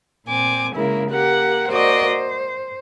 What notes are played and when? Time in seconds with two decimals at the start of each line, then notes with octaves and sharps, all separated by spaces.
0.26 A#2 C4 G#5 D6
0.74 C#3 G#3 A#3 E4
1.09 A#3 G4 F#5
1.70 A#3 F#4 C5 D5 D#5
2.06 C5